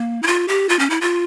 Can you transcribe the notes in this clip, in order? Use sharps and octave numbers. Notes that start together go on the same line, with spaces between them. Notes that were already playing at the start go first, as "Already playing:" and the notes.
Already playing: A#3
E4
F4
G4
F4
C#4
E4
F4